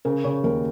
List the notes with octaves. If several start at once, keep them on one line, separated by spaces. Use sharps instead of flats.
C#3 A#4
C#3 C#5
D#2 A#4